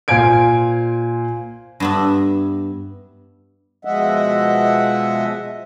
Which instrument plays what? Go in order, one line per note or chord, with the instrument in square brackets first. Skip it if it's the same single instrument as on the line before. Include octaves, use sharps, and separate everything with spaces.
[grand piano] A#2 C5 F5 G#5 G#6 D7
[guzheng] G2 B3 E5
[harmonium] B2 F3 G#3 D#5 E5 F#5